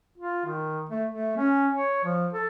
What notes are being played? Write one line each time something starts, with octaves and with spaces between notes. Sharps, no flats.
F4
D#3
A3
A3
C#4
C#5
F3
A4